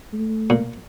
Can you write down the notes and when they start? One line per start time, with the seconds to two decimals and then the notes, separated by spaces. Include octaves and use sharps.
0.13 A3
0.50 A#2